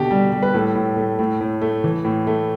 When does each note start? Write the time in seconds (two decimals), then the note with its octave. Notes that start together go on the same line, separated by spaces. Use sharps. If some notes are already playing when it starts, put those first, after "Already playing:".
Already playing: B2 D3 G4
0.11 G3
0.32 G3
0.43 B4
0.54 A2 A4
0.75 A2
0.97 A3
1.19 A2
1.41 A2
1.62 A3
1.84 E3
2.05 A2
2.27 A3